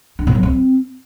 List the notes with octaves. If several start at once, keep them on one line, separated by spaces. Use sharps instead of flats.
D4
A#2
F#3
C4